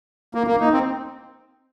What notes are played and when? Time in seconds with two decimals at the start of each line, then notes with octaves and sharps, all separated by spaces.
0.35 A#3
0.47 A#3
0.60 D#4
0.73 C4